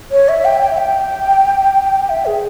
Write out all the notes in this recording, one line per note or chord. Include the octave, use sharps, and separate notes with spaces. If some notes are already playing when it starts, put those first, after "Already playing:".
C#5
E5
G5
G5
E5
G5
E5
G#4